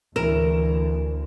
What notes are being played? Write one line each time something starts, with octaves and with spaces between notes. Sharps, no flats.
D2 E3 A#4 E7